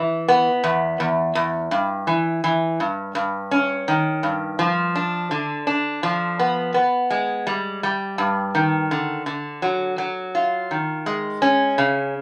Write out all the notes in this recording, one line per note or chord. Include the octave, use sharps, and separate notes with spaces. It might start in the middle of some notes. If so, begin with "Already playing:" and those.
Already playing: E3
B3
E2
E2
E2
G2
E3
E3
G2
G2
C#4
D#3
G2
F3
D4
D3
D4
F3
B3
B3
G#3
G3
G3
G2
D#3
D3
D3
F#3
F#3
F4
D#3
G#3
C#4
C#3